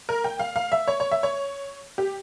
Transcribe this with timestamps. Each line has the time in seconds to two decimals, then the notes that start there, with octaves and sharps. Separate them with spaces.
0.09 A#4
0.24 G5
0.39 F5
0.56 F5
0.72 E5
0.88 C#5
1.00 C#5
1.11 E5
1.23 C#5
1.98 G4